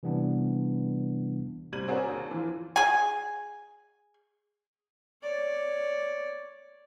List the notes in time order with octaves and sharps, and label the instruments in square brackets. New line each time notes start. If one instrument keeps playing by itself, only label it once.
[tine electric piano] C3 E3 G3 B3 D4
[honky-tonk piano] G1 C3 G3 G#6 D#7 F#7
C4 C#4 F#4 G#4 A#4 D5
D#2
E3 F3 F4
[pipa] G#4 G#5
[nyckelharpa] C#5 D5